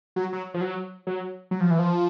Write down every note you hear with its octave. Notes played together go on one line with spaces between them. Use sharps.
F#3
F#3
F3
F#3
F#3
F#3
F3
E3
F3